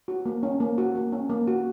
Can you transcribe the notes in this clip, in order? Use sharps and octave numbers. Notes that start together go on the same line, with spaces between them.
F#4
A#3
C#4
A#3
F#4
A#3
C#4
A#3
F#4